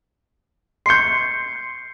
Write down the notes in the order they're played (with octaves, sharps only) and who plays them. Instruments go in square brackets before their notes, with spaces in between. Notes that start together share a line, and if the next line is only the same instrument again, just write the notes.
[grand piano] C6 G6 [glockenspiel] C7 C#7